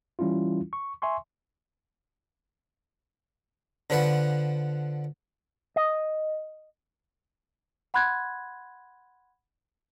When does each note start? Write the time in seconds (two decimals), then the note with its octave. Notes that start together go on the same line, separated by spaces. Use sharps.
0.19 E3 G3 C#4 E4 F4
0.73 C#6
1.02 E5 G#5 C6 C#6
3.90 D3 F3 B4 F#5
5.76 D#5
7.94 F#5 B5 C6 F#6 G#6